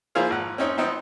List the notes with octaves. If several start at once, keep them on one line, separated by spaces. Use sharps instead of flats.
F3 A#3 E4 F4 G#4 F5
G#1 F#5
C4 C#4 D#4
F3 B3 C4 D#4